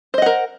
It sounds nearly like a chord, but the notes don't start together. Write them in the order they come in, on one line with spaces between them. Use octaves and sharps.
C5 D#5 F#5 A#4